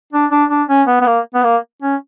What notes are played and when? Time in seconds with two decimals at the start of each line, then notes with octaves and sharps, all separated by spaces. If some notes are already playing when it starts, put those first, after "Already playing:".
0.13 D4
0.31 D4
0.50 D4
0.69 C#4
0.87 B3
1.01 B3
1.06 A#3
1.34 B3
1.43 A#3
1.82 C#4